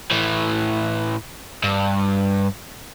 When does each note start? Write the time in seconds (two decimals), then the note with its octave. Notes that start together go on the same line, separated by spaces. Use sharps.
0.11 A2 E3
1.63 G2